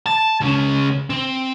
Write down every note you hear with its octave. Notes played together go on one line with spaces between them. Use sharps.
A5
C#2 C#4
C4